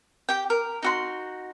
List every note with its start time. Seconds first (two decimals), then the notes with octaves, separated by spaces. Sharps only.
0.29 G4 G5
0.50 A#4
0.83 D#4 F#4 C6